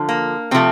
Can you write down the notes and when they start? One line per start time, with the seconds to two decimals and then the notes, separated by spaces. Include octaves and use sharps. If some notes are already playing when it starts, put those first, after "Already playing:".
Already playing: D3 F3
0.09 A#3
0.51 C3 F3 A3 C4